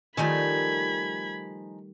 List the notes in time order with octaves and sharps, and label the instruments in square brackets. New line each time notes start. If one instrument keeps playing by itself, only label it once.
[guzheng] D#3 G3 A3 [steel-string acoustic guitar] F3 D#4 G#5 [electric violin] B5 G#6